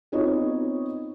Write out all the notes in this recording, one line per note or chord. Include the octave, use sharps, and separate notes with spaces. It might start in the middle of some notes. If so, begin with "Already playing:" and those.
B3 C4 D#4 F4 C#5 D#5